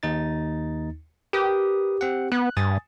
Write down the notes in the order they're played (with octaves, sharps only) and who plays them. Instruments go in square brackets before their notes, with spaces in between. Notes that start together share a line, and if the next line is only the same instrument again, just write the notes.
[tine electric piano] D#2 D#4 A6
[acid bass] G4 [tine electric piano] A#4 B4 D#6
[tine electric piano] C4 F#5
[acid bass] B3 [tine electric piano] F#6
[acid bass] G2 [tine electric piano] G#5 D#6 A6